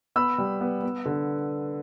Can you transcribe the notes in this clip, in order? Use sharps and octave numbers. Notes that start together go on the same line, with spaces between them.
B3 B5 E6
G3
B3
B3
D3